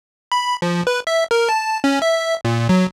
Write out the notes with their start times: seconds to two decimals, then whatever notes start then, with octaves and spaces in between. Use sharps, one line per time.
0.32 B5
0.62 F3
0.87 B4
1.07 E5
1.31 A#4
1.49 A5
1.84 C#4
2.02 E5
2.45 A#2
2.69 F#3